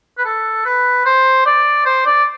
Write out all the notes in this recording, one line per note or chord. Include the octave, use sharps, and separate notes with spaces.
B4
A4
B4
C5
D5
C5
D5